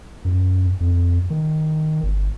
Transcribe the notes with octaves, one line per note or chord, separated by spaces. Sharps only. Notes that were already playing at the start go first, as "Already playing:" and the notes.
F#2
F2
D#3
G1